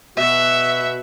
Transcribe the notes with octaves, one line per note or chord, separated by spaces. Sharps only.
B2 F#4 E5